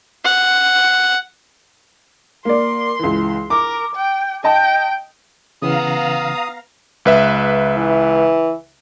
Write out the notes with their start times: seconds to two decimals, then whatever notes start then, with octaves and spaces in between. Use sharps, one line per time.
0.25 F#5
2.45 A#3 D5 C6
2.99 C#2 E3
3.50 A#4 D6
3.95 G5
4.44 D#5 G5 A5
5.62 C#3 E3 B3 F5 A#5 D#6
7.05 C#2 B4 E5
7.77 E3